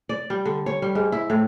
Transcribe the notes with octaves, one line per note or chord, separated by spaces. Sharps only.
D5
G3
D3
C#5
G3
G#2
E4
A2